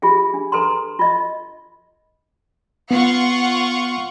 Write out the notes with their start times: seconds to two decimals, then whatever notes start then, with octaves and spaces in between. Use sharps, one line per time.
0.02 F4 G4 G#4 E5
0.34 D4
0.52 A4 B4 A#5 C6
0.99 F4 D#5
2.91 B3 F4 F#5 C#6